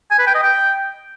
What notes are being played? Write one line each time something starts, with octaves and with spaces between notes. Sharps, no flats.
G#5
B4
G5
D#5
G5